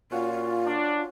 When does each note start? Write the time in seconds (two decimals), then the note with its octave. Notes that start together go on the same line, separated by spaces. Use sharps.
0.12 A#2 C#4 F4 F#4 F5
0.66 D4